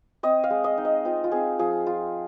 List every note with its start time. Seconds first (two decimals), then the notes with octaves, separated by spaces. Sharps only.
0.23 C4 D#5
0.44 F5
0.50 G#3
0.64 D#5
0.78 D#4
0.85 D#5
1.05 C4 F4
1.24 F4
1.32 C4 G#4
1.59 F3 G#4
1.87 F4